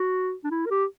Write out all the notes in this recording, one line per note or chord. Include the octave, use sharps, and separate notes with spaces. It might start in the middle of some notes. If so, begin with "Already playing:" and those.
Already playing: F#4
D4
E4
A#4
G4